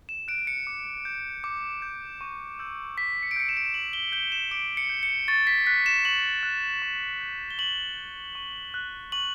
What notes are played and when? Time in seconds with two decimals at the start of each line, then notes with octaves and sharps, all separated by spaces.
0.09 E7
0.28 F#6 D7
0.47 C#7
0.67 D6
1.05 G6
1.44 D6
1.82 G6
2.21 C#6
2.59 E6 G6
2.98 C#6 B6
3.23 C#7
3.31 D7
3.36 E6 G6 C#7
3.49 E7
3.57 D7
3.65 E7
3.74 D6 F#7
3.93 G7
4.12 G6 G7
4.32 E7
4.51 D6 D7
4.77 C#7
4.90 G6
5.03 C#7
5.28 C#6 A6
5.47 B6
5.67 F#6 B6
5.86 E7
6.05 C#6 F#7
6.43 F#6
6.82 C#6
7.21 G6
7.51 G7
7.58 C#6 F#7
7.97 G6
8.35 C#6
8.74 F#6
9.12 C#6 F#7